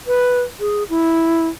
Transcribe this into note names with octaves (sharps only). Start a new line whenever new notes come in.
B4
G#4
E4